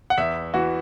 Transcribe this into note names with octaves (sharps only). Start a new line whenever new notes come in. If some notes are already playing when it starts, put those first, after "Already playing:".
F#5
E2 E5
E3 F#4